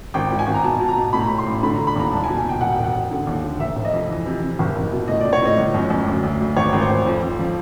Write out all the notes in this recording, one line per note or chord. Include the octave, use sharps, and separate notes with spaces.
G#1 G5
G#2
G#5
G#1
A#5
B2 A5
B2 A5
A#5
B2
A2 B5
A#5
A2 B5
C6
A1
D3 B5
D3 A#5
B5
D#2 A#5
C2 A5
G#5
B2
G#5
B2 G5
E1 F#5
G5
E1
F#5
E1
D3
D#2
D3
F1 E5
F1
D#5
F2
E3
C3
C3
F#1
F#1
B2
A2 D#5
A2 D5
C#5
A2 D#5
G1
F#2
F#2
D2
D2
D2
G#1 C#5
G#1
C5
G#1
F2
F2
F3